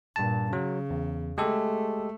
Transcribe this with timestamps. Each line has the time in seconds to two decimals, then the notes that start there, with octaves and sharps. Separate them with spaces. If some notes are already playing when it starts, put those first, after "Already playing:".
0.16 G2 A#2 A5
0.53 C#3 F#3
0.90 E2
1.38 G#3 A3 G4 A4